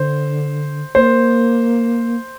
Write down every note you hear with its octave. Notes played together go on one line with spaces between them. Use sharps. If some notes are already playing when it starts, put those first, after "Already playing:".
Already playing: D3 C5
A#3 C5